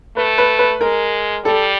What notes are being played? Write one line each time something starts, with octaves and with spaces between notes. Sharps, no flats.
A3 B4
B4
B4
G#3 A#4
G3 A4